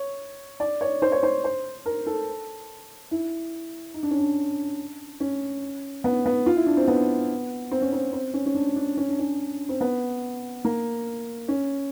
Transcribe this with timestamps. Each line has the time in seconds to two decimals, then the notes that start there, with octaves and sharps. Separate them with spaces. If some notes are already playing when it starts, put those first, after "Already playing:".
Already playing: C#5
0.60 D5
0.81 C#5
1.02 C5
1.12 C#5
1.23 C5
1.44 C5
1.86 A#4
2.07 A4
3.11 E4
3.94 D#4
4.03 D4
4.11 C#4
4.18 D4
5.20 C#4
6.04 B3
6.26 B3
6.46 F4
6.57 E4
6.67 D4
6.77 C4
6.88 B3
7.71 C4
7.82 C#4
7.93 C4
8.13 C4
8.34 C#4
8.46 C#4
8.55 D4
8.76 D4
8.97 C#4
9.09 D4
9.19 C#4
9.69 C4
9.81 B3
10.65 A#3
11.48 C#4